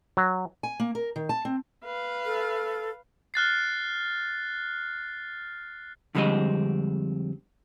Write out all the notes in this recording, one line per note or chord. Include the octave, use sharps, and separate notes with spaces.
F#3
G#5
A#3
A#4
D#3
A5
C4
B4 F5
A4
F6 F#6 A6 C7
F2 D3 G3 G#3 C4 D#5